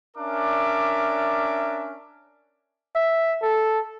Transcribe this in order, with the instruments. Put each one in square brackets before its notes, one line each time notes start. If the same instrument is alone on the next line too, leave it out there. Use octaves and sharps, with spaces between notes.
[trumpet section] C#4 D4 A#4 D5 E5 D6
[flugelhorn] E5
A4